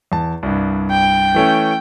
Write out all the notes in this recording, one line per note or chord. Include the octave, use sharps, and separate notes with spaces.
E2 A5
C2 G2
G5
E3 A3 C#4